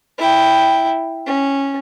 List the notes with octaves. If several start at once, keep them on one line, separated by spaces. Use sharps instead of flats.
E4 G5
C#4